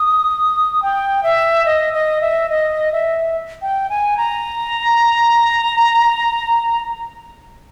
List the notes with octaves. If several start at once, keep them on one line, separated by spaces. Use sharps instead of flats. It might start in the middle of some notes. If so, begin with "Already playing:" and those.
Already playing: D#6
G5
E5
D#5
D#5
E5
D#5
E5
G5
G#5
A#5